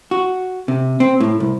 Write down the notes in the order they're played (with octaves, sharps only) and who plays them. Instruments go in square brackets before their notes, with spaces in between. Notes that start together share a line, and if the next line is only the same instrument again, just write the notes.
[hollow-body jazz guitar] F#4
C3
C4
A2
C2